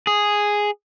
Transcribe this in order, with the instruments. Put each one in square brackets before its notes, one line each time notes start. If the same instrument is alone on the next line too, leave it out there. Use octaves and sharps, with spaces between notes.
[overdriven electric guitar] G#4